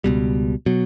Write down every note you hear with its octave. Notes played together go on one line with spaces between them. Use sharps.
C#2 B2 G3
B2 F#3